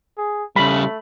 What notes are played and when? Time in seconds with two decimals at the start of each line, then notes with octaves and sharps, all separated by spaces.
0.18 G#4
0.56 C#3 G3 A3 B5